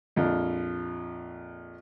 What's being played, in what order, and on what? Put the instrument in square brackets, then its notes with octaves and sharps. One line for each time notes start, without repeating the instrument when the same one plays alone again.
[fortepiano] A#1 F2